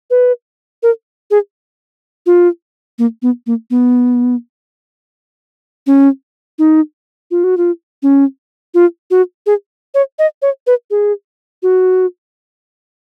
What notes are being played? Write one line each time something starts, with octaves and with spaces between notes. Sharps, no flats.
B4
A#4
G#4
F4
A#3
B3
A#3
B3
C#4
D#4
F4
F#4
F4
C#4
F4
F#4
G#4
C#5
D#5
C#5
B4
G#4
F#4